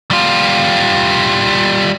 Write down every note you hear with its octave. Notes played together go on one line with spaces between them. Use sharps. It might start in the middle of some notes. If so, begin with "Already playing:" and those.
G3 F4